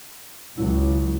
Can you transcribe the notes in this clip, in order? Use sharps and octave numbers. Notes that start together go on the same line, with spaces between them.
C#2 F#3 E4